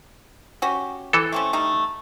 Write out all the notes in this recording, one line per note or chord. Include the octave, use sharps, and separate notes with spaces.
C#4 F#4 G4
E3 A4
A3 C4 C#4
G3 A3 D#4